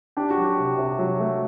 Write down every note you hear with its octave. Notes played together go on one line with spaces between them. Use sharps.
D4 G4
F#4
F#3
G4
C3
C3
F#3
A3